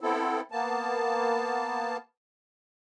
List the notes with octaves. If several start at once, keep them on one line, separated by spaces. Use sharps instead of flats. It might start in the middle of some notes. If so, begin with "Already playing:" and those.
B3 C4 E4 A4
A#3 B3 A5